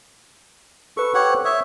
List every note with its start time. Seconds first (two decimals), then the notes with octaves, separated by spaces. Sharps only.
0.97 A4 B4 C#6
1.15 G4 C#5 F#5
1.30 C5
1.45 C#5 E5 D#6